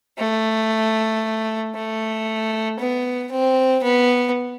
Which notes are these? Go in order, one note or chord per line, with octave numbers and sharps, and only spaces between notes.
A3
A3
B3
C4
B3